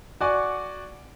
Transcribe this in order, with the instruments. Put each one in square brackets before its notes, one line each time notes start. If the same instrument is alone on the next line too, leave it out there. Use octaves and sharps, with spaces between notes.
[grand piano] F#4 D5 G#5 C#6